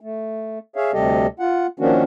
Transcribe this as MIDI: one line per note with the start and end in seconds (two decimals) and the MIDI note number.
0.01 0.59 57
0.76 0.92 68
0.76 0.92 73
0.76 0.92 76
0.76 0.92 77
0.93 1.27 38
0.93 1.27 48
0.93 1.27 55
0.93 1.27 67
0.93 1.27 69
0.93 1.27 75
1.39 1.67 65
1.39 1.67 78
1.80 2.03 51
1.80 2.03 53
1.80 2.03 58
1.80 2.03 61
1.80 2.03 62
1.80 2.03 66